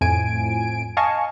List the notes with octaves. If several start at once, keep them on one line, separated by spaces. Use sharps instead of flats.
F2 A2 G#5 D7
D#5 F5 G#5 A5 C#6